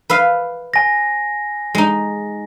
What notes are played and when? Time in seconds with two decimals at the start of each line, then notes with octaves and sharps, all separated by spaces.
0.10 B4 E5 F5
0.74 G#5 A#6
1.75 G#3 D#4